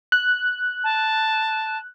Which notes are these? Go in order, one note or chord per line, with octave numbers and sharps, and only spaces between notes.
F#6
A5